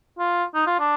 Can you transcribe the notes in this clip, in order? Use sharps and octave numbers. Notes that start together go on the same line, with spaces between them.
F4
D#4
F4
D4